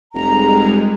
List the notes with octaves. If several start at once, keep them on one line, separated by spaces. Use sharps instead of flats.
F1 G3 G#3 A#5